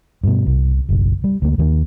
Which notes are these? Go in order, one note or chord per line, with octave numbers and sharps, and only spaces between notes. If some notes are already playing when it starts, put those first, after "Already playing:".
G2 B2
C2
F#1 B1
G3
D2 A#3
D#2 D#3 G#3 A#3